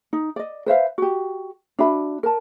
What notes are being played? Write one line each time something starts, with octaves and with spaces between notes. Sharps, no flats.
D#4
D5 D#5
B4 C5 E5 F5
F#4 G4
D4 F#4 E5 B5
A#4 A5